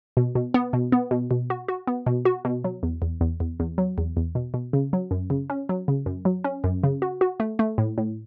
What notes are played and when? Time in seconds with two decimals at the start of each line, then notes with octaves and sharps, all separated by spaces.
0.17 B2
0.35 B2
0.54 B3
0.73 B2
0.92 B3
1.11 B2
1.31 B2
1.50 F#4
1.68 F#4
1.87 B3
2.06 B2
2.25 F#4
2.45 B2
2.64 F#3
2.83 E2
3.02 E2
3.21 E2
3.40 E2
3.60 E2
3.78 F#3
3.98 E2
4.17 E2
4.35 B2
4.54 B2
4.73 C#3
4.93 F#3
5.11 F#2
5.30 C#3
5.50 C#4
5.69 F#3
5.88 C#3
6.06 F#2
6.25 F#3
6.44 C#4
6.64 F#2
6.84 C#3
7.02 F#4
7.21 F#4
7.40 A3
7.59 A3
7.78 A2
7.98 A2